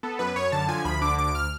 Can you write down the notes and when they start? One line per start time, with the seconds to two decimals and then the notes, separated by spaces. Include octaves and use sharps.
0.03 B3 A4
0.19 F#2 B4
0.36 F#2 C#5
0.52 D3 A5
0.68 F3 G#5
0.85 D2 B5
1.01 D3 D6
1.18 D2 D6
1.35 F6